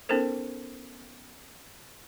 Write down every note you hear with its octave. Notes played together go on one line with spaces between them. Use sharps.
B3 C#4 D#4 A4 A#4 C5